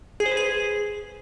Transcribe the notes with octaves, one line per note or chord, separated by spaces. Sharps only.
G#4
C5
B4
G#4